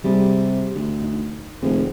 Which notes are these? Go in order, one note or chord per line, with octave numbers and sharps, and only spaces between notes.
C3 G3 A#3 G#4
D2
D#4
F1 D#2 F3 G#4